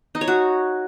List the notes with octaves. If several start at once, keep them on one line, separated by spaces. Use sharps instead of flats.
D#4
C#5
F#4